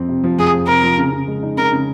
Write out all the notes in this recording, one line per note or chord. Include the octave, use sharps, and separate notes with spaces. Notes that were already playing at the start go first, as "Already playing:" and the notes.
Already playing: F2 C4
C3
F3
F2 G#4
C4
C3 A#4
F3
C#3
C#3
G#3
D#4
C#3 A#4
C#3